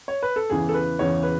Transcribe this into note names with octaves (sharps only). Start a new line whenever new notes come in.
C#5
B4
A4
E2 C#3 E3 G#4
A4
B4
E2 C#3 E3 C#5
B4